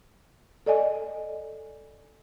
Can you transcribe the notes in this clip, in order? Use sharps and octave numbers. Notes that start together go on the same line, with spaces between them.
A4 D5 D#5 G#5